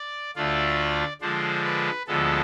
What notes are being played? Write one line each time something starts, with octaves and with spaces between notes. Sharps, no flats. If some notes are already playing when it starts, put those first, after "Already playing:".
Already playing: D5
D2 D3 A3 D4 F4 D5
D3 F3 G#3 D4 C5
B4
D2 D3 F3 G#3 B3 A4